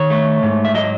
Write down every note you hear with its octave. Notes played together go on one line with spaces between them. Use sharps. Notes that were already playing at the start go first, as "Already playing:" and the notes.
Already playing: D#3 C#5
A3
G#2
E5
F#3 D#5